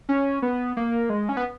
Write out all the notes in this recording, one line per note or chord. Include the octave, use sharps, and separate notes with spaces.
C#4
B3
A#3
G#3
C#4
B3